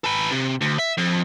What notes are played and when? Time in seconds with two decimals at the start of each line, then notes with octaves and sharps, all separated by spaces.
0.04 A4 B4
0.31 C3
0.62 D2
0.79 E5
0.98 F2